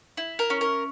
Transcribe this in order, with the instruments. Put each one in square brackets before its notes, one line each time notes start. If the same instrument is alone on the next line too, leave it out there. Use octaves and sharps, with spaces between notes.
[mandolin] E4
A#4
C#4
A#4